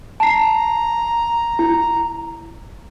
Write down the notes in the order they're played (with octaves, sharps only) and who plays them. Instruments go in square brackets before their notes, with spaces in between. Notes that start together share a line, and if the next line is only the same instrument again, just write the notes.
[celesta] A5 C7 [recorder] A#5
[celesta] E4